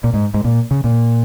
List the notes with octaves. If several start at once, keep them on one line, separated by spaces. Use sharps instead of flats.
A#2
G#2
G#2
A#2
C#3
A#2